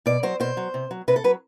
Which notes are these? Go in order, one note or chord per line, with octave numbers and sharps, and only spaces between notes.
B2 D5
F#3 C5
B2 C5
F#3
C3
F#3
C3 B4
A4
F#3 B4